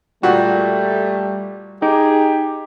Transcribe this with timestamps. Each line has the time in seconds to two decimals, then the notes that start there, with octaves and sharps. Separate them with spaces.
0.23 A#2 G3 A3 F#4
1.82 D#4 G4 G#4